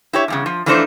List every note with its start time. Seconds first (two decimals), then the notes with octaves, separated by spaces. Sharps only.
0.13 E4 G4 C#5
0.28 E2 G2 C#3
0.46 F3
0.66 E3 F3 A3 D4 D#4 C5